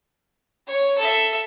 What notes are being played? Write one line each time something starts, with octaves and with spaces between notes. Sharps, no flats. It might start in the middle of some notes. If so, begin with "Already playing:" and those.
C#5
A4 E5